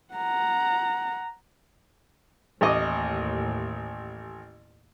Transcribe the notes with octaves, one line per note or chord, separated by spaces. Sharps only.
F#5 A#5
A1 D#2 A2 D#5 D6